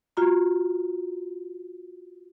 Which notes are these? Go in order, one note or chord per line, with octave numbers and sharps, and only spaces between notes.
F4 F#4 A#5